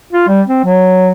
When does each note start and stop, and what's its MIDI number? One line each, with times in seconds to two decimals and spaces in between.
0.13 0.26 65
0.28 0.42 55
0.47 0.63 60
0.64 1.12 54